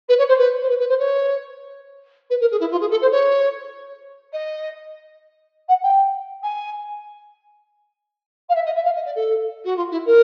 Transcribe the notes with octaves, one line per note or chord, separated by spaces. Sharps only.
B4
C#5
C5
B4
C5
B4
B4
C5
C#5
B4
A#4
G#4
E4
F4
G#4
A4
C5
C#5
D#5
F#5
G5
G#5
F5
E5
D#5
E5
F5
D#5
D5
A4
F#4
F4
E4
A#4